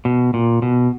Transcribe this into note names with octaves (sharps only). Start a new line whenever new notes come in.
B2
A#2
B2